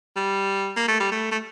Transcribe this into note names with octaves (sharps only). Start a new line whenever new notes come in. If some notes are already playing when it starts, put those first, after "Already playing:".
G3
A#3
A3
G3
A3
A3